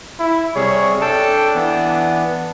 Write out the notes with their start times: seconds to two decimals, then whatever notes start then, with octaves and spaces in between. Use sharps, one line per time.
0.20 E4
0.56 C3 G3 G#4 C#5
1.01 D4 A4 G5 A5
1.55 E3 B3